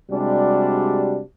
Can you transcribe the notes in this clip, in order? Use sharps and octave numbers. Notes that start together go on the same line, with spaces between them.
C3 G3 G#3 D4 F#4